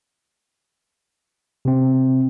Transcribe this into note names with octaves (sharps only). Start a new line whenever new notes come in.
C3 C4